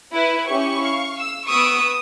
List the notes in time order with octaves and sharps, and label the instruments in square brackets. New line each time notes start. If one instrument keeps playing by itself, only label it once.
[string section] E4 B4
[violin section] C#4 E4 G4 [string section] C#6
[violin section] F5
[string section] E6
[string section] B3 C#6 [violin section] B5 E6 D7 [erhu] D#6